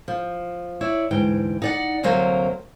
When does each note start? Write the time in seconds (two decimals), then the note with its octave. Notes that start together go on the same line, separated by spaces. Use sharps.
0.08 F3
0.81 E4 C#5 D5
1.11 D2 G#2 E3 G5
1.62 D#4 D5 F#5
2.03 D2 C3 F#3 A#3 C5